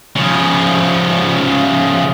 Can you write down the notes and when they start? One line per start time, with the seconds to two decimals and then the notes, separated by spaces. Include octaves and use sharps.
0.16 C#3 F3